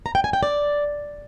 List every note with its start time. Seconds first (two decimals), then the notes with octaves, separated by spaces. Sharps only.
0.06 A#5
0.15 G5
0.24 G#5
0.33 G5
0.43 D5